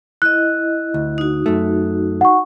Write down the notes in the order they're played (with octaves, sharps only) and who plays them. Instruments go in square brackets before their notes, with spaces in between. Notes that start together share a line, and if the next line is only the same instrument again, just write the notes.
[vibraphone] E4 D#5 [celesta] F#6
[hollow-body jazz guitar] D2
[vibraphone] D#4 F#4
[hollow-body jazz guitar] F#2 A3
[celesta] F#5 C#6